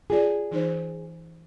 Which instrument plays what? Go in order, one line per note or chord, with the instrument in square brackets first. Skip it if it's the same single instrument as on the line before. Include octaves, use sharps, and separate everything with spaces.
[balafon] F4 D5 [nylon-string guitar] G#4
[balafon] E3 D#4 C5